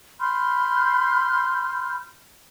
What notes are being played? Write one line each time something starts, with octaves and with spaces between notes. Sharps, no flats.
B5 C6 F6 G6